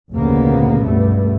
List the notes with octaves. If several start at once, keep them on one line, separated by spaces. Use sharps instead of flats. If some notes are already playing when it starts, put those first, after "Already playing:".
F1 D2 A#2 C#3 A#3 B3
C#2 G2 B2 A3